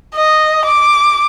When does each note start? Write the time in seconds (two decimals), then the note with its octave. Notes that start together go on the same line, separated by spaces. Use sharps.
0.15 D#5
0.66 D6